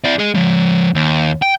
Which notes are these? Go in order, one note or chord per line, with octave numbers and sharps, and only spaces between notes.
E4 D5
G#4 D#5
F3 G#3
D#2
G5